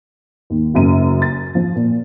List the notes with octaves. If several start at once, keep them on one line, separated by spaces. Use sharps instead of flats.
D#2
F#1 F#2 D#7
A6
F3
A#2